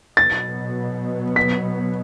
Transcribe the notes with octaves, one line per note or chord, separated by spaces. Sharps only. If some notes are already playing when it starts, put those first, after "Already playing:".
B2 F#3 B3 A6
B6